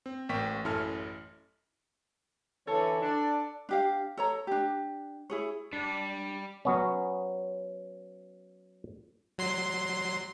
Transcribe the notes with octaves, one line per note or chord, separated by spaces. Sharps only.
C4
A1 A#3 G5 C#6 B6
A1 F#2 E4 A4 G#5 F6
D3 E3 A4 C#5
D4
D4 G4 F5
A4 C#5 A#5
D4 G4
E4 G#4 C#5
G3 D4
F#3 B3 C#4
F#3 C6 C7